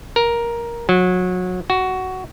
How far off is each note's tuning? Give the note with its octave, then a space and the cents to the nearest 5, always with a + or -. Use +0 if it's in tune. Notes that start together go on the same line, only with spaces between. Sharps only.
A#4 +10
F#3 -25
F#4 +10